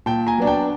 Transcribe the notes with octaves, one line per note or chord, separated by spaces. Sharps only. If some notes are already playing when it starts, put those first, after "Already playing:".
A#2 G5 A5
G#5 A#5
F#3 B3 D4
G5 A5